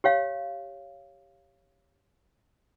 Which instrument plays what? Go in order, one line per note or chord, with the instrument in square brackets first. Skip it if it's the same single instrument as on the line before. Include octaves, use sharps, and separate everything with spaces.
[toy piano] G4 C#5 F5